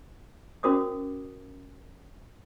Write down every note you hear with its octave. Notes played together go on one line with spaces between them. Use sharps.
C#4 F#4 A#4 C5 D6 D#6